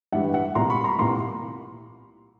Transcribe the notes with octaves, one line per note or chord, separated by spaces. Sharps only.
G2 E3 G3 E5 F#5
E5 F#5
C2 A#2 G3 A#5 C6
B5 C#6
A#5 C6
C2 A#2 G3 A#5 C6